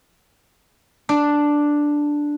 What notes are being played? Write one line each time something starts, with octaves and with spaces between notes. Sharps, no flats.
D4